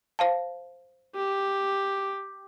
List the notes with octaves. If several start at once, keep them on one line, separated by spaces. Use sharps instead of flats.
C5 F5 A5
G4